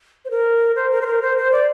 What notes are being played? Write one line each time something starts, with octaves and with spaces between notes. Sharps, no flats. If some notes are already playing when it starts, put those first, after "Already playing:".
C5
A#4
C5
A#4
C5
A#4
C5
C5
D5